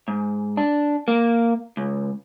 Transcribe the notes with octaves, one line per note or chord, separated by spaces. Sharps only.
G#2
D4
A#3
C#2